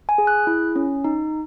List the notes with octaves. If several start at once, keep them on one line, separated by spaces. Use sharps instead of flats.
G#5
G#4
F#6
E4
C#4
D#4